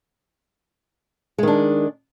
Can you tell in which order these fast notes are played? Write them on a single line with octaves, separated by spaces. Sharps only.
G#3 D#3 D4